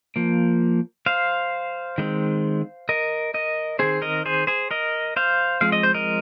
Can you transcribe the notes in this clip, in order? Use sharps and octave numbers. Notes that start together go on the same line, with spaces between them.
F3 A#3
C5 F5
D#3 G#3 C4
A#4 D#5
A#4 D#5
D#3 C4 G#4 C5
A#4 D#5
G#4 C5
G#4 C5
A#4 D#5
C5 F5
F3 G#3 C4 F5
D#5
C5
A#4 D#5